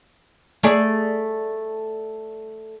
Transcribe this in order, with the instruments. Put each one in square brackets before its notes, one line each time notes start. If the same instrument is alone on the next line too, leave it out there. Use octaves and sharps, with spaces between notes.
[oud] A3 G#4 D5